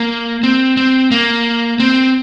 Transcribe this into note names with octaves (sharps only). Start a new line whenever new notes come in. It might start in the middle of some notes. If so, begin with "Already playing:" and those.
Already playing: A#3
C4
C4
A#3
C4